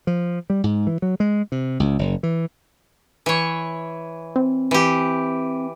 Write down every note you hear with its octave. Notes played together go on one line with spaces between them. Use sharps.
F3
G3
G#2
E3
F#3
G#3
C3
C#2
F#1
E3
E3 C#5
C4
E3 G4